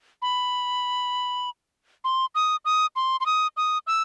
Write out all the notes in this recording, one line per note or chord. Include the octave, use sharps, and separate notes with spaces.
B5
C6
D#6
D#6
C6
C6
D#6
D#6
E6